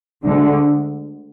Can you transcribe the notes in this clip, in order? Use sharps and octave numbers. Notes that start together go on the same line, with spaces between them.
D2 D3 G#3